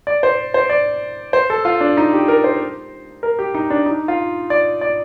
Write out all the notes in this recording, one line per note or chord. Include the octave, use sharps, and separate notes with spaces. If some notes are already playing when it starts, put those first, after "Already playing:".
D5
C5
C5
D5
C5
A4
F4
D4
D#4
G4
A#4
C5
A#4
G4
D#4
D4
D#4
F4
D5
D5